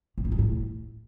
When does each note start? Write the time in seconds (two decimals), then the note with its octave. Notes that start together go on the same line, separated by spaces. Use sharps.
0.18 A#2
0.25 G#2
0.32 C3
0.39 A2